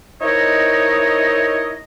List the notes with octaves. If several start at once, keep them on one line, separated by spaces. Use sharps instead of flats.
D#4 E4 A#4 C5 C#5 D#5